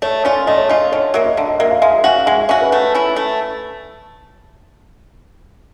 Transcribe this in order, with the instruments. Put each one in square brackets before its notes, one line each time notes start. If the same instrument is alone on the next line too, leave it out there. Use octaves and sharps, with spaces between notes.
[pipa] A3 [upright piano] C#5
[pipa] C#4 F4 [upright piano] D5
[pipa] A3 [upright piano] D#5
[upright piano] C#5
[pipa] C#4 F4 [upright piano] D#5
[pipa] D3 [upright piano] C#5
[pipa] F#3 A#3 [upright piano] E5
[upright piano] D#5
[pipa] D3 [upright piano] D5
[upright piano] D#5
[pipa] F#3 A#3 [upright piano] E5
[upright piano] F5
[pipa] G#3 [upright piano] E5
[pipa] C#4 F#4 [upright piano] F5
[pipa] G#3 [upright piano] E5
[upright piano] F5
[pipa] C#4 F#4 [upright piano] E5
[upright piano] B4
[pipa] A3
C#4 E4
A3